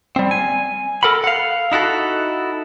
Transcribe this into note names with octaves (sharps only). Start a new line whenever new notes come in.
G3 C4
G#5
A4 A#4 F#5 B5
F5 F#5
D#4 E4 F#4 A4